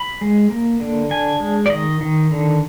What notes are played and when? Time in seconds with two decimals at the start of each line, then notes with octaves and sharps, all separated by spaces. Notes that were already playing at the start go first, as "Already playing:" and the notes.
Already playing: B5
0.21 G#3
0.50 A#3
0.80 D3
1.10 D4 G#5
1.40 G#3
1.66 D5
1.70 D#3 D#5
2.01 D#3
2.31 D3